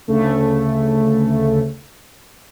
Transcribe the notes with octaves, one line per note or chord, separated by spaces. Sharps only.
D2 C#3 A3